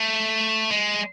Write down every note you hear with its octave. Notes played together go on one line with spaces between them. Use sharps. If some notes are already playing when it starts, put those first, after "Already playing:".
Already playing: A3
G#3